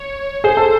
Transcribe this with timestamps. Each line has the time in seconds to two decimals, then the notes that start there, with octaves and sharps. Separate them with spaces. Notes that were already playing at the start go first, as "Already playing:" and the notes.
Already playing: C#5
0.44 G#4 C5
0.57 A4